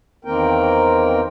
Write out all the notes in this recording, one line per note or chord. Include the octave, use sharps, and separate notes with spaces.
E2 D#3 A#3 C4 A#4 G5